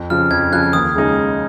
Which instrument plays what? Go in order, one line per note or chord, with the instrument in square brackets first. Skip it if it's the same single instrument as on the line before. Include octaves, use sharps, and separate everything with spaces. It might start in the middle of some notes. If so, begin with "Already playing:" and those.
Already playing: [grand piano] F2
[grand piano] C#3 F3 [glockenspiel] F6
[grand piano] F2 [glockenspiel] G#6
[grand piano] C#3 F3 [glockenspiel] F#6
[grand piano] D#2 [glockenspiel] D#6
[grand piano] C#3 G#3 D#4 G#4